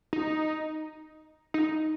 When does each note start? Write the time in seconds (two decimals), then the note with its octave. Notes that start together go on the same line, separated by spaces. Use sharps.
0.13 D#4
1.54 D#4